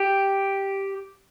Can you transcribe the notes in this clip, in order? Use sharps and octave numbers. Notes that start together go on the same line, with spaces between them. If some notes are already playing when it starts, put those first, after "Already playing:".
Already playing: G4